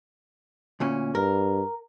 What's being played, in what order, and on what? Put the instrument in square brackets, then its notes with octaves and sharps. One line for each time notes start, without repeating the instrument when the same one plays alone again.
[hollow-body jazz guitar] D2 A#2 C#4
[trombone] G2 [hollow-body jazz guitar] A#4